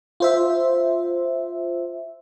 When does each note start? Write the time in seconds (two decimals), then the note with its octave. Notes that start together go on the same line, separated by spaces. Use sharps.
0.20 F4 C5 E5